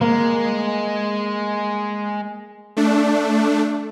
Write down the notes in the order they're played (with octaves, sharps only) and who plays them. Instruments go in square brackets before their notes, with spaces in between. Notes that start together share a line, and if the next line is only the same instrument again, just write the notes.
[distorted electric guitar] G#3 [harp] A#3
[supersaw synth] A3 D4